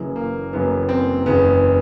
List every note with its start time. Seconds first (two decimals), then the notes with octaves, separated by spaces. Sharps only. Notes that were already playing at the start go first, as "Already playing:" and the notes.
Already playing: F#1 F#2 C#3 E3
0.16 A#3
0.52 F#1 F#2 C#3 E3 B3
0.89 C4
1.26 F#1 E2 C#3 B3